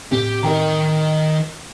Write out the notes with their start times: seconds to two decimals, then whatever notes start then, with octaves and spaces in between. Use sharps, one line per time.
0.12 A2 C4 G4
0.43 D#3 D#4 A#4 G5 A#5